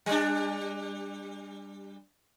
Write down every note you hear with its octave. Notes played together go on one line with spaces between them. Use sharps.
G3 D4